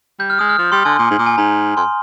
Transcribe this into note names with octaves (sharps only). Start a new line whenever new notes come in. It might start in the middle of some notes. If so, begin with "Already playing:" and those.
G3 G6
F6
G#3 D#6
F6
F3
G3 C6
D3 G#5
A#2
G#2
A#2
G#5
G#2 A#5
F2 C6